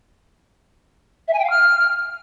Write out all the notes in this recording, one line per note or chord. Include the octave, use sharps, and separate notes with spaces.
E5
G#5
G5
F5
F6